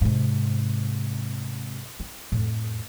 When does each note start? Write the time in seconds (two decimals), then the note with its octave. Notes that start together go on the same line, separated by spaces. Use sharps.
0.01 G#2 C3
2.00 C4
2.32 F2 A2